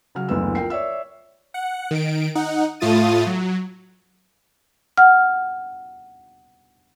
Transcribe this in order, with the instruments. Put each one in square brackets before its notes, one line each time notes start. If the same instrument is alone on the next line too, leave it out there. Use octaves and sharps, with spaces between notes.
[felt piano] C#3 F#3 F6
F#1 D2 E3 B3 E6
F3 A#4 G5 C7
C#5 D5 E5 E6
[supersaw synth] F#5
D#3 D7
D#4 F#5
A2 A3 F4 D#6 A6 D#7
F#3
[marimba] F#5 F6